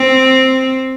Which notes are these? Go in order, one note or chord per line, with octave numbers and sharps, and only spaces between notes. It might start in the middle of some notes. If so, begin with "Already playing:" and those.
Already playing: C4